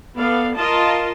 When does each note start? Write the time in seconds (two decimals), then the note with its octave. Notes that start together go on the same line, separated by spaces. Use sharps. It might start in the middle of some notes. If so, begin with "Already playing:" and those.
0.17 B3 A4 D5 F5
0.57 F4 A#4 D#5 A5